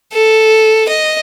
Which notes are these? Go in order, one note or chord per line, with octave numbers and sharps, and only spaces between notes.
A4
D#5